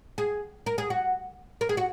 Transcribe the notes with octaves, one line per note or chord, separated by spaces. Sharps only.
G#4
A#4
G#4
F#4
A#4
G#4
F#4